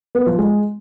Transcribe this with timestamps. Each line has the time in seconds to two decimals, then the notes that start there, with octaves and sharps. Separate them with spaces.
0.15 B3
0.26 F3
0.38 G#3